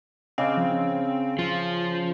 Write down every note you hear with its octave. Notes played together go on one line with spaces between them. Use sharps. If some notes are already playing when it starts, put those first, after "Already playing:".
C#3 C4 D#5 D6 F6
F3
C#4
F3 F4